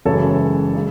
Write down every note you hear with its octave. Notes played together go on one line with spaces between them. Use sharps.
F#1 F#2 C#3 E3 G#3 A4 C#5
C#3 G#3